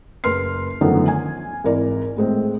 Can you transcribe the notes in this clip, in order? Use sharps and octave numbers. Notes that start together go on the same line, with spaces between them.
F#1 A#4 B4 C6 F6 C7
F#2 D3 D#3 F3 A3 B3
G#5
G#1 E3 A#4 D5
A2 G#3 C4